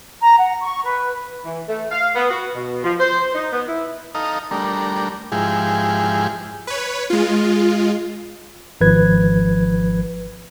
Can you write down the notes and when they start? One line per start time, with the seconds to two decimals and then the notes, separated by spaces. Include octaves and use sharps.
0.21 A#5
0.38 F#5
0.61 C#6
0.84 B4
1.45 E3
1.69 A3
1.91 F5
2.16 B3
2.31 F#4
2.55 B2
2.84 F3
3.00 C5
3.34 D#4
3.52 B3
3.68 E4
4.15 D#4 A4 D#5 F5 A#5
4.51 G3 A3 D4 A#4
5.32 G#2 F3 G#3 E4 G4 G#4
6.67 B4 C#5
7.10 G#3 F4
8.81 G#1 F3 B4 G#6